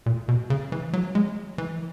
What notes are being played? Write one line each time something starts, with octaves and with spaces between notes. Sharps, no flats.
A#2
B2
C#3
E3
F#3
G#3
E3